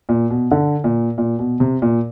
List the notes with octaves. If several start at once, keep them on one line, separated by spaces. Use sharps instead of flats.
A#2
B2
D3
A#2
A#2
B2
C3
A#2